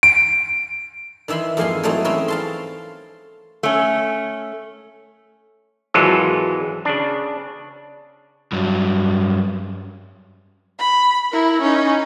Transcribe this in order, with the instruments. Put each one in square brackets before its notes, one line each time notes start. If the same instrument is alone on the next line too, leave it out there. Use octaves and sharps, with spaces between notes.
[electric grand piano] D7
[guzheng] D#3 E3 E5 B5 C6
F2 G#2 A#3 F5 G#5 C6
E3 F#3 A3 C4 D#4
C4 C#4 G#4 A#4 B4
F5 A5 C6
[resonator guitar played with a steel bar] A3 C#4
[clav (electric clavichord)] G#1 E3 F#3 G#3 F4 A4
C#3 D4
[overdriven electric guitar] G2 F#3
[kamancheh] B5
E4 A#4
C#4 D#4